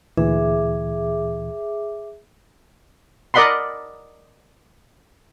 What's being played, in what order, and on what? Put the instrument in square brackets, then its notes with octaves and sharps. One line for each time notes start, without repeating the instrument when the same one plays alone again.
[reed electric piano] D2 A#2 E3 [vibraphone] G#4 E5 D6
[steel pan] A#4 D5 D#5 F#5 B5 C6